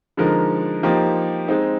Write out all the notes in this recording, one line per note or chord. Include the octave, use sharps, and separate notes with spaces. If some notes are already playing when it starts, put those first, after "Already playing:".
D3 F3 G#3 D#4 A#4
F3 A#3 D#4 G4 C5
G#3 C4 D#4